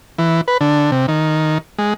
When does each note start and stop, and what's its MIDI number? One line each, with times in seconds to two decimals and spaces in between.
0.19 0.41 52
0.48 0.58 71
0.61 0.91 50
0.92 1.06 48
1.08 1.58 51
1.79 1.94 56